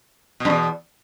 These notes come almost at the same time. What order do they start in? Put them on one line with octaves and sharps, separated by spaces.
B2 G2 E2